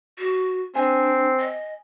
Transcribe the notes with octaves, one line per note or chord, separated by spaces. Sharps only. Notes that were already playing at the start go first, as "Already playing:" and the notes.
F#4
C4 D4 G#5
D#5